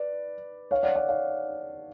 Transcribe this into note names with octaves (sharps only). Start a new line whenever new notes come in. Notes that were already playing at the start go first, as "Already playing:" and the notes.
Already playing: B4 D5
C#5 F5
D5 F#5
D5 F#5
C#5 F5